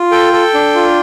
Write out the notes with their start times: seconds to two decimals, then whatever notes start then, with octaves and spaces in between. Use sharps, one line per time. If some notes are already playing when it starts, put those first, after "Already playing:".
Already playing: F4
0.12 A4 G5
0.33 A4
0.54 D4
0.76 F4